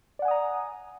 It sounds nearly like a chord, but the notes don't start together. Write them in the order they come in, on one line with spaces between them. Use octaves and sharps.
D5 F#5 G#5 D#6 A#5